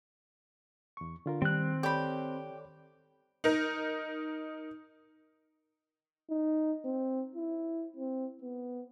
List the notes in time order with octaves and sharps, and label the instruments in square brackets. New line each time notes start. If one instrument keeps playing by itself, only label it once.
[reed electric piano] E2 C#6
D3 F4 A#4
[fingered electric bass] D#3 [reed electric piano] G3 [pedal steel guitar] C4 F#6
[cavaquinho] G4 B5 [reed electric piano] A4 C#5 D5
[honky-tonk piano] D#4 A#4
[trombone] D#4
C4
E4
C4
B3